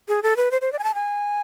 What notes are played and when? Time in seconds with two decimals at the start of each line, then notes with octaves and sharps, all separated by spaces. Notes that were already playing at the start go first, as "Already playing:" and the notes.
0.08 G#4
0.23 A4
0.37 B4
0.51 C5
0.61 C5
0.72 D5
0.79 G#5
0.84 A5
0.94 G#5